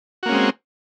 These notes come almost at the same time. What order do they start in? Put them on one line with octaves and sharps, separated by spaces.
F#4 A#3 C#4 G#3 C4